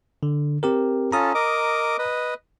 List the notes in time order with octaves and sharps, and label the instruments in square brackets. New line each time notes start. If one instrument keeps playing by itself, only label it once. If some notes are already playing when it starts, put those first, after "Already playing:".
[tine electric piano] D3
C4 G4 A#4
[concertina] C#4 F4 A4 [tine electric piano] A#5 D#6
[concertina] A#4 D#5 D6
B4 D#5